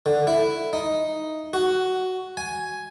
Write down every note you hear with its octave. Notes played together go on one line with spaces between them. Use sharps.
D3
E4
D#4
F#4
G#5